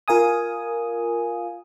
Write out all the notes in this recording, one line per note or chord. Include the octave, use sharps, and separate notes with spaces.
F4 A#4 F5 G#5 D#6